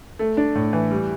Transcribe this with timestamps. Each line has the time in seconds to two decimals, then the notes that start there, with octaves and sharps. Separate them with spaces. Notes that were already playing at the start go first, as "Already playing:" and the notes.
0.19 A3
0.37 D4
0.55 A2
0.73 E3
0.91 G3